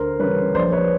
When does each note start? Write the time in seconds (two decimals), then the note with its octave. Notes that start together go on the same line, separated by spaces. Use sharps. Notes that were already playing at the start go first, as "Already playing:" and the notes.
Already playing: D2 A#4 C5
0.19 C#3 E3 G3 B4 C#5
0.54 A#1 C5 D5
0.72 B4 C#5